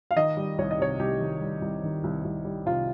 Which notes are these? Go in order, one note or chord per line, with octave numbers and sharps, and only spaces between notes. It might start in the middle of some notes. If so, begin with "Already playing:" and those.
F5
D#3 D#5
G3
C2 C#5
D#5
C3 C#5
C2 G4
D#3
G3
C2
D#3
C2
C2
G3
C3 F4